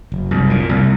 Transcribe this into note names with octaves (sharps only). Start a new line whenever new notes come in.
F#1
C2
A#2
C2